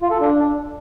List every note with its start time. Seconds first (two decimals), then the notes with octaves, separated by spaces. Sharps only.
0.01 F4
0.11 A4
0.21 D4